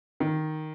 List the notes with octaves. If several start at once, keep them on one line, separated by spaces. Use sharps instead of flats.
D#3